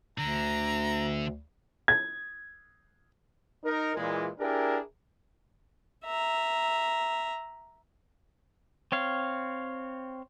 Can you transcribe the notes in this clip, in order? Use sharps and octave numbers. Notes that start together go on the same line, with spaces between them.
D2 D3 A#5
G#6
D#4 A#4
A#2 E3 G#3
D4 E4 G4 G#4 A#4
E5 A#5
C4 C#5 F5